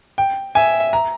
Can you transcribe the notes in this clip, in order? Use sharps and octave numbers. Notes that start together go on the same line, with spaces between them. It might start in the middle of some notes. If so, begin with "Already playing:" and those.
G5
E5 G#5
A#5